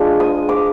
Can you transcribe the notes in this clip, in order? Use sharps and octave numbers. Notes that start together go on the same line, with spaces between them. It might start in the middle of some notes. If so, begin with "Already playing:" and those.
Already playing: G#3 D4 F4
D#6
D6